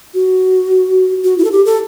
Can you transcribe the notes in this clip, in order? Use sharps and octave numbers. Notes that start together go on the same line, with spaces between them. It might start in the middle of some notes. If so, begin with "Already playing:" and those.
F#4
F#4
E4
A4
G4
A4